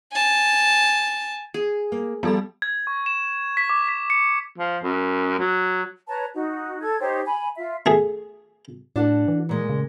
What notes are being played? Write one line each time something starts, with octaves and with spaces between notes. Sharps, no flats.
G#5 A5
G#4
A#3
F3 G3 B3 A4 B5
G#6
C#6
E7
B6
D6
B6
C#7
F3
F#2
F#3
B4 C#5 A5 A#5
D#4 F#4
A4 G#6
D#4 G4 C5 C#5
G#5 B5
F4 E5
A3 G#4
A2 D4 F#4 A4
E3
A#2 G#3
C#3